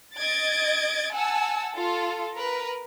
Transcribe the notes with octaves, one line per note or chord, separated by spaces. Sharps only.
D#5 G#6 A6 D7
F#5 G#5 A5 E6
F4 A4
A#4 B4